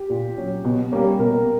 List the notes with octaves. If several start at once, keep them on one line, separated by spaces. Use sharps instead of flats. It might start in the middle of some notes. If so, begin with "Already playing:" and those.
Already playing: G4
A#2
F#3 C#4
B2
G3 A#3 C#4
B2 A#4